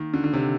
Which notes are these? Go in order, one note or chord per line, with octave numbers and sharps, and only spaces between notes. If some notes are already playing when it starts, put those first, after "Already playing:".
Already playing: D#3 A#3
D3
D3
C3